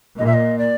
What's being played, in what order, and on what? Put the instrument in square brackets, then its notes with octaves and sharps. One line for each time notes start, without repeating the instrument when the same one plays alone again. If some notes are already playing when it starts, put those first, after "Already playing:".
[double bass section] A#2 [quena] D#5
[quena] E5
D#5
D5